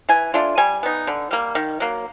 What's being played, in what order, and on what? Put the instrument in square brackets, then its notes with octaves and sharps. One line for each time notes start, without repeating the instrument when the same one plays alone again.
[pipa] E3 G#5
A3 D4 F4
G3 G#5
B3 D#4
D3
G3 A#3
D#3
F#3 A#3